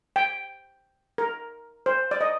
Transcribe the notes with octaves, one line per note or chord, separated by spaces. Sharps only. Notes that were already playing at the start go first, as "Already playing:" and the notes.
G5
A#4
C5
D5
D#5